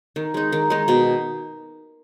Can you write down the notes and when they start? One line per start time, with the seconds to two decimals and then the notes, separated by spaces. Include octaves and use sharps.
0.16 D#3
0.34 G#3 D#4
0.52 D#3
0.70 G#3 D#4
0.88 B2